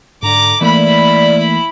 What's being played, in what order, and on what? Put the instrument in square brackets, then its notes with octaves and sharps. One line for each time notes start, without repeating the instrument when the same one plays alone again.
[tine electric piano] G#2 [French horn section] D3 [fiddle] A#5 D6
[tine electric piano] E3 A3 A#3 [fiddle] E4 B5 [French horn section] D5